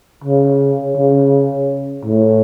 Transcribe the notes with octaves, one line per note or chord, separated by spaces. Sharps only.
C#3
C#3
A2